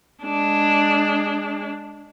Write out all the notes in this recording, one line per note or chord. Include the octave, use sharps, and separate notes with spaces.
G#3 D4